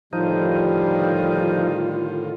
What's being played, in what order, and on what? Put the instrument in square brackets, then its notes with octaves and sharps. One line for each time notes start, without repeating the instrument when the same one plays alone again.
[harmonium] A2 D3 D#3 [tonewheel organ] F3 D#4 [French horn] G3 [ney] F4